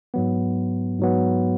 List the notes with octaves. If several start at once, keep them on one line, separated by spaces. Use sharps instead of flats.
G#2 F#3 B3
G#2 F#3 B3